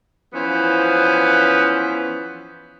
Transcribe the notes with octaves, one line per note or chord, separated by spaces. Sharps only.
E3 F3 B3 C#4 C5